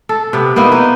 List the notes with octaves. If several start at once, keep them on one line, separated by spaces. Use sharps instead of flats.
A4
C3 B3
A#3 B3 D#4 E4
D#4